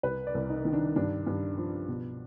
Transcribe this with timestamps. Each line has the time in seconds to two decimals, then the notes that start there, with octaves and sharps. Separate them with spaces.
0.03 C2 B4
0.27 D5
0.34 C2
0.50 D#4
0.65 D#3
0.73 D4
0.96 G2 D4
1.26 G2
1.57 F3
1.88 B2